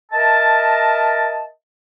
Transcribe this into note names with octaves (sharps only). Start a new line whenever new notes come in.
A#4 D#5 E5 A5